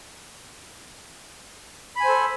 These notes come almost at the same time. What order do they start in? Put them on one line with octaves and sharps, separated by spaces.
B5 G#5 C5 A4